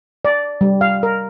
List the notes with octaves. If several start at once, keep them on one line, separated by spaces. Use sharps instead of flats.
D5
G3
F5
A#4